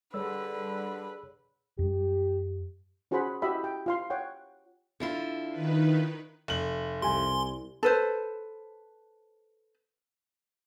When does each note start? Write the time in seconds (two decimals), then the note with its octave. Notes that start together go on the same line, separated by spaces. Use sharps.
0.14 D3 G3 G#4 B4 C#5 E6
1.79 F#2 G3 G4
3.11 C#4 F#4 G#4 C5 F#5 B5
3.42 E4 F#4 G4 D#5 E5 B5
3.64 G5
3.86 F4 F5 C6
4.10 C#5 F#5 G5
5.00 D3 E4 F4
5.52 D#3 B4
6.48 F1 F#7
7.02 C2 G4 G#5 C6
7.83 A4 B4 C5